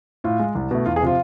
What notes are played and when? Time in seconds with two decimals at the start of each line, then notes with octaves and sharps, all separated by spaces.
0.24 A2 F4
0.40 G#3
0.55 C2
0.71 B2 A3
0.86 E2 F4
0.96 G#4
1.02 C3 F3 F4